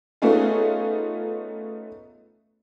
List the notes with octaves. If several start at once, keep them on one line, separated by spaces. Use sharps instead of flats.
A3 B3 C#4 D#4 F4 G#4